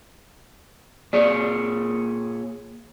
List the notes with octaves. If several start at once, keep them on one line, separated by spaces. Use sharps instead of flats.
A#2 G#4 C#5 D5